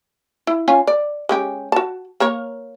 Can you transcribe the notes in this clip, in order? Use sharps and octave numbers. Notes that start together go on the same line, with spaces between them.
E4
C#4 F4 G#5
D5
G#3 C#4 G4
F#4 A5
A#3 A#4 C#5